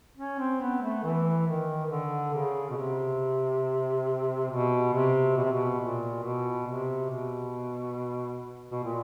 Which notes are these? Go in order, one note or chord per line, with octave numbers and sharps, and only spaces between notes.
C#4
C4
B3
A3
E3
D#3
D#3
D3
C#3
B2
C3
B2
C3
B2
C3
B2
A#2
B2
C3
B2
B2
A#2